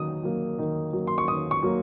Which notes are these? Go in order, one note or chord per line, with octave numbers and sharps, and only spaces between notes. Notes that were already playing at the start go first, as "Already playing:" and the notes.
Already playing: D#3 F#3 A#3 D#6
F#3 A#3
D#3
F#3 A#3
C6
C#6
D#3 D#6
C#6
F#3 A#3